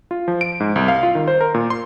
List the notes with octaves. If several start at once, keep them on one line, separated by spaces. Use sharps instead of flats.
F4
F3
D7
G#2
C2
F5
F4
D#3
C5
A#4
A#2
C6